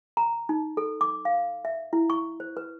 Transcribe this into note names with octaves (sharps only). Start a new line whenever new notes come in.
A#5
D#4
A4
D6
F5
E5
E4
C#6
C5
B4